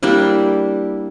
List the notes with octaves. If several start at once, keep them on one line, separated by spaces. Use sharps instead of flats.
G3 A#3 D4 E4